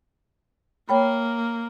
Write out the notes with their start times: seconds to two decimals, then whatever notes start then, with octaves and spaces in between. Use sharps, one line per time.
0.89 A#3 C#5 G5 B5